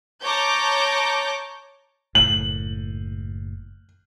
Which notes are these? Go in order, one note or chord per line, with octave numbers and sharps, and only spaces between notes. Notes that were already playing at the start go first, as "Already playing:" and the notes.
C#5 A5 A#5 D6 G6
F#1 A2 F#7